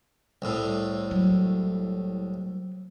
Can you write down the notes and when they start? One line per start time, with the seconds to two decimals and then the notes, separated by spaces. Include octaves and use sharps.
0.42 C2 A2
1.11 F#3